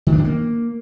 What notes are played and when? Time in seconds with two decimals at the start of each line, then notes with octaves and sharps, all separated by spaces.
0.07 D#3
0.12 D4
0.18 D#3
0.24 A#3